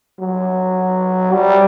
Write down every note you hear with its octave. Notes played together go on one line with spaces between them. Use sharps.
F#3
G3